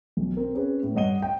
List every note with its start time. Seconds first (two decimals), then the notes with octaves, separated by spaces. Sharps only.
0.17 B1
0.37 C4 A#4
0.55 C#4 G#4 B4
0.83 A2
0.95 G2 C#5 D#5 F#5 D#7 G7
1.22 G5